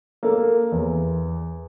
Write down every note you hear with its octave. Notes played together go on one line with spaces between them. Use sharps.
A#3 A4
E2